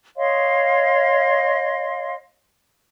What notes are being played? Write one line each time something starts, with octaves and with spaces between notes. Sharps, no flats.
C#5 D#5 F5 C6